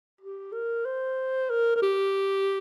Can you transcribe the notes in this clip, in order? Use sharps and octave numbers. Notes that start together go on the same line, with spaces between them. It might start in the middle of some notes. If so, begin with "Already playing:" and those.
G4
A#4
C5
A#4
A#4
G4